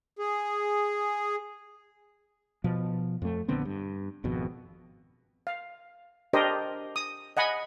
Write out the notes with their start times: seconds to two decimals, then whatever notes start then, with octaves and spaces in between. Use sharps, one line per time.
0.19 G#4
2.64 B2 F3
3.22 F2 A3
3.48 A#1 D3 B3 C4
3.65 G2
4.24 G#1 F2 B2
5.47 F5
6.33 D4 G4 A#4 C5 D#5
6.96 D#6
7.37 D#5 F#5 G#5 B5